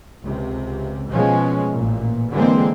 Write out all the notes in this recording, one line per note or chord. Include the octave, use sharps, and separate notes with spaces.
C#2 C3
B2 F3 G#3 C#4
A1 A#2
D3 E3 G#3 A#3 C4